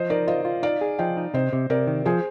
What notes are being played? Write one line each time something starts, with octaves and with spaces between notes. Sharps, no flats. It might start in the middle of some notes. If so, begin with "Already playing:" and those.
Already playing: F3 C5 D#5
D#4 A#4 D5
F4 C5 D#5
F4
D#4 D5 F5
G#4
F3 D#5 G5
D#4
C3 C5 D#5
C3
C3 A#4 D5
D#3
F3 G#4 C5